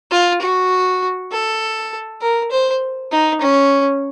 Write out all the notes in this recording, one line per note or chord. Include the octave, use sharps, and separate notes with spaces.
F4
F#4
A4
A#4
C5
D#4
C#4